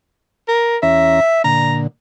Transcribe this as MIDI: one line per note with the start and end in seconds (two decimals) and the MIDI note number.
0.48 0.77 70
0.83 1.20 40
0.83 1.20 61
0.83 1.42 76
0.83 1.20 82
1.44 1.87 46
1.44 1.87 50
1.44 1.80 82